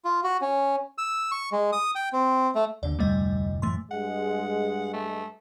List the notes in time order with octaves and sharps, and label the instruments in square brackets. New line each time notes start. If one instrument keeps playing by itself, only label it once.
[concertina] F4
F#4
C#4
E6
C#6
G#3
D#6
G5
C4
A3
[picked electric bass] D#2 D3 [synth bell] D5
[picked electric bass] F1 D2 A2 [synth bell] G3 A3 D#5
[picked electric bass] F#2 A2 E3 [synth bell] A3 C6
[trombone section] G2 G#3 [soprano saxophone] F#5
[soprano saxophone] A3